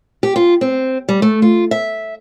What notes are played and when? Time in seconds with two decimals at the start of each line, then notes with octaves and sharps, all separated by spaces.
0.23 G4
0.36 F4
0.61 C4
1.09 G3
1.22 A3
1.42 F4
1.71 E5